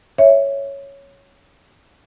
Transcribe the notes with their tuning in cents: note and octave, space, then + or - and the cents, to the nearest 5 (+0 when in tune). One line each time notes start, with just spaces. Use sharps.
C#5 +0 E5 +0